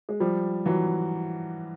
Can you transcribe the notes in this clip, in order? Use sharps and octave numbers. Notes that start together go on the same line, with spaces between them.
G#3
F3 G3
E3 F#3